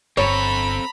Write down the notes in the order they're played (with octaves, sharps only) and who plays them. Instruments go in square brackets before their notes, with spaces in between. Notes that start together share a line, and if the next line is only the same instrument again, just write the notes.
[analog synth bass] G1 [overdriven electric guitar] C4 A4 [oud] C#5 [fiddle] A#5 B5